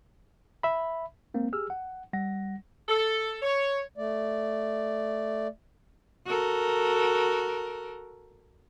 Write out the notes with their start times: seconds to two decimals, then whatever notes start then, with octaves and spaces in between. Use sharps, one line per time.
0.63 E5 B5
1.34 G#3 A#3 C4
1.53 G4 G#4 E6 F6
1.70 F#5
2.13 G3 F#5 A#6
2.88 A4
3.41 C#5
3.98 A3 D5
6.26 F#4 A4 A#4